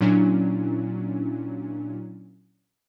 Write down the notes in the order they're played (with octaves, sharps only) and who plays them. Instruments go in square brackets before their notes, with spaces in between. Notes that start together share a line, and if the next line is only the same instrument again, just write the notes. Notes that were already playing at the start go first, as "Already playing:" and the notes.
[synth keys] A#2 F#3 C#4 D4 E4